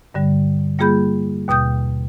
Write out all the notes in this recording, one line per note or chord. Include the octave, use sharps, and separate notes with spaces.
G2 D3 G3
G3 A#3 F4 G#4 B5 G6
D#2 B2 G5 D#6 G6